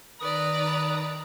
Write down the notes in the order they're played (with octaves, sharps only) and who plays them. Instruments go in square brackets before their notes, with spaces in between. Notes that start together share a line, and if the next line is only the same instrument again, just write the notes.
[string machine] D#3 [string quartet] B4 D5 A#5 [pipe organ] D#6